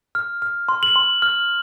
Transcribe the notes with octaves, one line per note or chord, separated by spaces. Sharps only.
F6
F6
C6
F#7
C6
F6